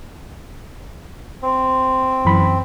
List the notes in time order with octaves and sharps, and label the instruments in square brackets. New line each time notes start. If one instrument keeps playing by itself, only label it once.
[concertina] C4
[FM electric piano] F#2 E3 B5